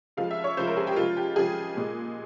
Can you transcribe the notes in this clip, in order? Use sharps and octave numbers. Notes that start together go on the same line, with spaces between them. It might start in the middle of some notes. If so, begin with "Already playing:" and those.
C#3 F3 G#3 F5
E5
C#5
C#3 F3 G#3 C5
A#4
G#4
G4
C#3 F3 G#3 F4
G4
C#3 F3 G#3 G#4
A#2 G#3